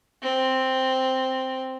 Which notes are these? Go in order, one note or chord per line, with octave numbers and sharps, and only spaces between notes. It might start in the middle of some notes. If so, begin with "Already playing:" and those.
C4